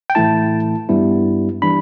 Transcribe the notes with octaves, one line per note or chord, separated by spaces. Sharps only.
G5
A2 E3 A3 E4 A5
G2 G3 B3 E4
E3 G3 D4 B5